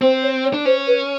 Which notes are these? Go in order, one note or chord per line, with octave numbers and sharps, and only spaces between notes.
C4 C5
C#5
C#5
D4
C#4 C5
B4